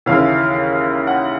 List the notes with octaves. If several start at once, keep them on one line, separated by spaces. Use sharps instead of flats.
D#2 C#3 E3 F5
F#5